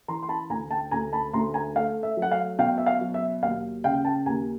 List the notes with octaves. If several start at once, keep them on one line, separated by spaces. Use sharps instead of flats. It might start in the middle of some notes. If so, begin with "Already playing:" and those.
E3 A#5 C6
C6
A5 B5
D2 G#5 A#5
G5 A5
D2 G#5 A#5
A5 B5
D2 A#5 C6
G#5 A#5
A3 F5
E5
F#3
F#5
F5
B2 F5 G5
E5
F5
F#3
E5
D#2 F5
C#3 F5 G5
G5 A5
D#2 G#5 A#5